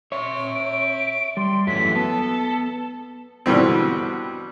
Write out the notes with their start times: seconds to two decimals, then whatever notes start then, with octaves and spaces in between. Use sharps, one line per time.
0.12 C#5 E5 C6
0.55 D7
1.37 G3 C6
1.67 F#2 E3 F#3 A3 B6
1.96 B3 A4 A5
3.46 B2 D3 E3 G3 C4